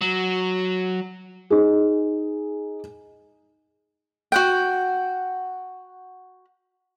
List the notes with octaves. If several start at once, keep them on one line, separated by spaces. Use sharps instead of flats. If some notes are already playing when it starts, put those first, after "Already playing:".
F#3
D#4 G#4
F#4 F#5 G5